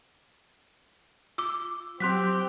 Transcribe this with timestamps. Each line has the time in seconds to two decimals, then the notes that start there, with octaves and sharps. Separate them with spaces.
1.38 F4 D6 E6
2.00 F#3 C4 G4 C6 F#6 B6